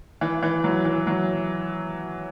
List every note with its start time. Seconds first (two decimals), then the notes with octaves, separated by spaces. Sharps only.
0.21 E3
0.43 E3
0.64 F#3
0.85 E3
1.07 F#3